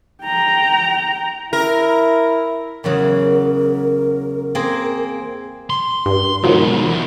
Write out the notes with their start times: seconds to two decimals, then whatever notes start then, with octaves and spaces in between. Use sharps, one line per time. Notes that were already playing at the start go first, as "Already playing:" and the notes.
0.24 G5 A#5
1.53 E4 A#4
2.84 E2 C#3 F#3 A#4
4.55 A#3 C4 G#4
5.70 C6
6.06 G2
6.44 G#2 B2 D#3 F3 F#3
6.85 E2